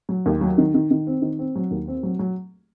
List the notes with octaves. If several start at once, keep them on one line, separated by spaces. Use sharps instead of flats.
F#3
D#2
F#3
D#3
D#3
D#3
C4
D#3
C4
F#3
D#2
C4
F#3
F#3